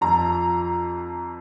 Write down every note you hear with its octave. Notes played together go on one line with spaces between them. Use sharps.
F2 F3 A#5